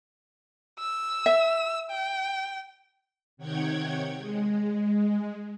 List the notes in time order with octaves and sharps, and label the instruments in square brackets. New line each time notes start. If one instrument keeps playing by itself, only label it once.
[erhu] E6
[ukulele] E5
[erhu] G5
[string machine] C3 D#3 C#5 F#5 G5 G#6
G#3